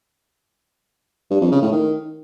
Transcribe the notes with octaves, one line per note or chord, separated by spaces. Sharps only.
G2
F2
C#3
A2
D#3